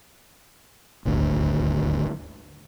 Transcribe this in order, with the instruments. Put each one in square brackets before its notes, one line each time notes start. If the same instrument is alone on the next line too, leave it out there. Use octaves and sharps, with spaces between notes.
[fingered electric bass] D#1 G#1 D2 D3